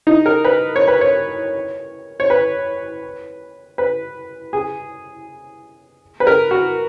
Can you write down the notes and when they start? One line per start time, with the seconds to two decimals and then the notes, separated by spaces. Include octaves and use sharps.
0.07 D#4
0.26 A#4
0.45 B4
0.76 C#5
0.88 B4
1.01 C#5
2.20 C#5
2.30 B4
3.78 B4
4.53 G#4
6.20 B4
6.27 A#4
6.51 F#4